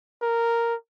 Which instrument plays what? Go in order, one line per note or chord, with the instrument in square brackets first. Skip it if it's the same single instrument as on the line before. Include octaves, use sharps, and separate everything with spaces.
[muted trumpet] A#4